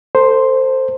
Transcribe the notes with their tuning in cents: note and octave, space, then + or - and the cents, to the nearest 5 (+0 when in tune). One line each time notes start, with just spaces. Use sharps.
A4 +35 C5 +0